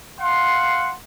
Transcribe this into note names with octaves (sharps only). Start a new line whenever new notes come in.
F5 F#5 C6